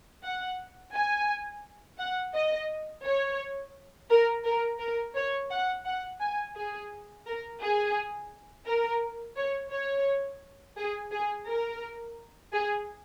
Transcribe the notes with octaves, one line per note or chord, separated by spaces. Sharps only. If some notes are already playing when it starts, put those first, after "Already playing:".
F#5
G#5
F#5
D#5
C#5
A#4
A#4
A#4
C#5
F#5
F#5
G#5
G#4
A#4
G#4
A#4
C#5
C#5
G#4
G#4
A#4
G#4